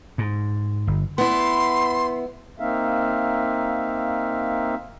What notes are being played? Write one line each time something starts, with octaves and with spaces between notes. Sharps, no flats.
G#2
G1
B3 E4 C6
A#3 C4 D#4 E5 F5